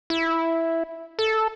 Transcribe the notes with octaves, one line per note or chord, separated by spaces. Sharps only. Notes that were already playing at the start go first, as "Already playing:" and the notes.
E4
A4